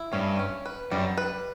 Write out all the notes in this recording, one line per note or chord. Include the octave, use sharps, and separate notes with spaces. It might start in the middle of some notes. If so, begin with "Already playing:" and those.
Already playing: E4
G2 C#4
C#4
B4
F#2 G3
B4